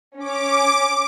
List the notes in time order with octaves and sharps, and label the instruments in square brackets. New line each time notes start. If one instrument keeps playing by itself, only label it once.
[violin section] C#4 [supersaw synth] D6